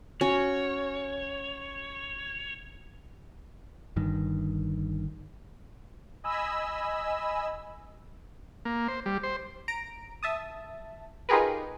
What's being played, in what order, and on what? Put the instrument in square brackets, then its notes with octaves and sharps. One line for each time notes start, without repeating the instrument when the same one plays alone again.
[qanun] C#4 F#4 [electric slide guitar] C#5
[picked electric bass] G1 G2 D#3
[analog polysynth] D#5 G#5 B5 E6
[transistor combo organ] A#3
C5
G3
C5
[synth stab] A#5 D7
E5 A5 D#6
D#4 F4 G4 G#4 A#4 B4